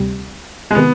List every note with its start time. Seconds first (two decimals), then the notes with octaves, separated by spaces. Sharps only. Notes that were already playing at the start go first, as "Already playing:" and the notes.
Already playing: D2 C3 G3
0.71 G#3
0.75 C3 D#3 B3